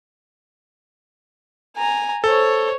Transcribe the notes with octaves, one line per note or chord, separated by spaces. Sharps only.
G#5 A#5
A4 C5 C#5